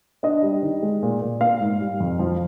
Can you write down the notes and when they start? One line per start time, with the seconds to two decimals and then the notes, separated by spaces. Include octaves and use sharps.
0.23 D4 D#5
0.42 G3
0.62 D#3
0.82 G#3
1.02 A#2
1.22 A#2
1.41 A#3 F5
1.61 G#2
1.80 G3
2.00 F2
2.19 F3